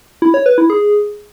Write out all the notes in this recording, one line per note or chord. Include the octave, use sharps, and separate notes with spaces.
E4
C#5
B4
E4
G#4